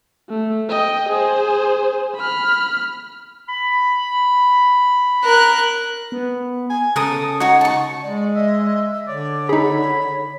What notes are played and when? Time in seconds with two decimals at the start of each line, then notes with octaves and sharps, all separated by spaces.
0.29 A3
0.69 D#5 G5
1.09 G#4 C5
2.16 B5 F6
3.48 B5
5.23 A#4 F#6
6.12 B3
6.70 G#5
6.96 C#3 A4 A#4 D#6
7.40 D#4 F#4 C#5
7.61 A5 C#6
8.03 G#3 D5
8.35 D#5 E5
9.07 D3 C#5 D5
9.49 D#4 G#4 B5